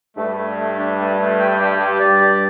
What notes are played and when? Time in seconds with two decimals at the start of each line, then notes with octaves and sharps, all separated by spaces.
0.17 G2 A3
0.37 A3
0.58 A3
0.78 D4
0.99 A3
1.18 A3
1.40 G5
1.59 G4
1.79 G4
1.99 G2 D5
2.20 G4